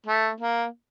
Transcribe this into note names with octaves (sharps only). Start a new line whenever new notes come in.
A3
A#3